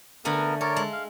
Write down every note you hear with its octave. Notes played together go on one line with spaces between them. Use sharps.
D3 A3 B3 A#4 G#5
A4 A#4 C#5 D5
G#3
F5